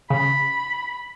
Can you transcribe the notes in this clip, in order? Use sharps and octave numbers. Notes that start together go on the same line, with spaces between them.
C#3 B5